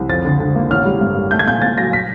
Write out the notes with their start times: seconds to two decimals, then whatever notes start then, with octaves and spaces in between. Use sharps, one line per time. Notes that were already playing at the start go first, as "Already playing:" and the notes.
Already playing: C2
0.09 F2 A6
0.25 D3
0.40 D3
0.55 A#3
0.70 A1 F6
0.85 G3
1.01 G2
1.16 G3
1.31 A3 G6
1.39 G#6
1.47 A#2 G6
1.62 A#2 A6
1.78 F#3 A#6
1.93 B6